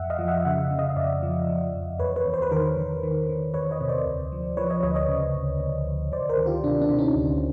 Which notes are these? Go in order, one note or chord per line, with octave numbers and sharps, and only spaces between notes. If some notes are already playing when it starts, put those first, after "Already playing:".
Already playing: F2 E5 F#5
D#5 F5
F3
E5 F#5
C#3 E5 F#5
C#3
D#5 F5
F2 D5 E5
F3
F3
F2
E2 B4 C#5
B4 C#5
E2
C5
B4
D#3 A#4 C5
D#3
D#3
D#3
E2 B4 C#5
C#5 D#5
C3
C5 D5
D2
F3
F3 B4 C#5
C#5 D#5
D2 C#5 D#5
C#5 D#5
C#3
D2
D2
D2
D2 C5 D5
A#4 C5
D#3
F4 G4
C3 D4
D4
C3
C#4 D#4
D2